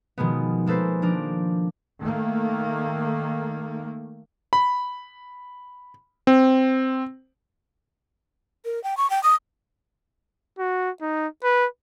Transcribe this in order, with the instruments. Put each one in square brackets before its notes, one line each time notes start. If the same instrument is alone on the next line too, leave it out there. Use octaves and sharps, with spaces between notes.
[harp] B2 D#3 F3 G#3 B3
G#3 A#3 A4 B4 C5
F3 D4 A#4
[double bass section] D#3 A3 A#3
[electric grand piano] B5
C4
[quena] A#4
G5
C#6
G5
D#6
[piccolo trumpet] F#4
D#4
B4